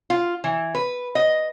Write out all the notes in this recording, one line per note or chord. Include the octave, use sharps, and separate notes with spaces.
F4
E3
B4
D#5